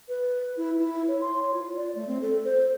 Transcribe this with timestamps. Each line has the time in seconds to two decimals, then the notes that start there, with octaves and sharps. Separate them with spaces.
0.08 B4
0.57 E4
0.79 E4
1.08 C#5
1.21 C6
1.42 C#5
1.54 F4
1.76 D5
1.95 A3
2.07 C4
2.22 A4
2.45 C5